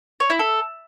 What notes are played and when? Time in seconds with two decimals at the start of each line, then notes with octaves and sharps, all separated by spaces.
0.20 C#5
0.30 E4
0.39 A4